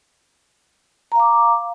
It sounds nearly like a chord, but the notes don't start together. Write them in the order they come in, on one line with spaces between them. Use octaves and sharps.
A#5 F5 D6